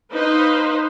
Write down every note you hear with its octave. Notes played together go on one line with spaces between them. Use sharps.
D#4 B4 C5 F5